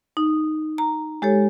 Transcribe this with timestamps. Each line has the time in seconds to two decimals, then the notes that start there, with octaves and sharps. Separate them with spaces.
0.17 D#4
0.78 A#5
1.22 G#3 G4 A4 C#5